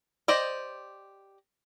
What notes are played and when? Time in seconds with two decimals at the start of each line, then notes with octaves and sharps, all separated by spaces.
0.28 G4 C5 D5 D#5